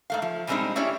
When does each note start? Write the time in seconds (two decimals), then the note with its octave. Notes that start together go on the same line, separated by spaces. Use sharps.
0.10 G#2 A3 F5
0.22 F3
0.47 B2 G3 G#3 C4 D4 D#4
0.76 A3 C#4 E4 G4 C#5 D5